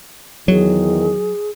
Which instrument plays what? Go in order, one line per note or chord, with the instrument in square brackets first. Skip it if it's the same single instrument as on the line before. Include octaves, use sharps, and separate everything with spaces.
[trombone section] E2 D#3 [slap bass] F#3 [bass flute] G#4